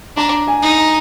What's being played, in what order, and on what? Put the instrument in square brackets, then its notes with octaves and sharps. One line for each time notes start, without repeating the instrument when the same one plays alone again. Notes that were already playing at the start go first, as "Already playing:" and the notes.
[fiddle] D4 [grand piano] A#5
[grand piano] G#5
[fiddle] D#4
[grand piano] A#5